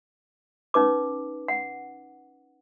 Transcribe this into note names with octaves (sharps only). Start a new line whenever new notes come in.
C#4 D#4 B4 D6
F#5